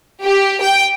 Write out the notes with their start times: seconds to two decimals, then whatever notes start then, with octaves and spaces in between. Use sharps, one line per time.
0.24 G4
0.62 G5